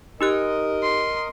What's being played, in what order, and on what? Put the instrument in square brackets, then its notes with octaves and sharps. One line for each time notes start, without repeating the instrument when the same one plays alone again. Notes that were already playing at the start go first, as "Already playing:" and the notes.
[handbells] D#4 G4 F#6 [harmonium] A#4 D#5
[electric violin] C6